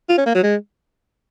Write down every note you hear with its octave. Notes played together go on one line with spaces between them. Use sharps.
F4
C#4
A#3
F#3
G#3